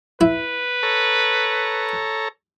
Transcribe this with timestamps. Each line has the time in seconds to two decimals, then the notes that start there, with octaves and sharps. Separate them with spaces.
0.21 E4 B4
0.83 A4 C#5 A#5